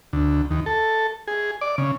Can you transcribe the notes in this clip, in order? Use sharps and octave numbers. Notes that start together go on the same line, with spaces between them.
D2
D#2
A4
G#4
D5
C#3